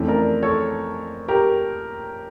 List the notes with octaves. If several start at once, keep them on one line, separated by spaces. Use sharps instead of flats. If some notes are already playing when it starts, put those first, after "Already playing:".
Already playing: F2 E3 A3 C#4
A#4 D5
A4 C#5
G4 A#4